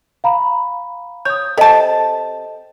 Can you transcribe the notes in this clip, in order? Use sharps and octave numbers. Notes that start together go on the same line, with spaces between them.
F5 A#5 B5
C#5 D#6 G6
C3 A4 D#5 A5